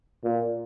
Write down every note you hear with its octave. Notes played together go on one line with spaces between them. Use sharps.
A#2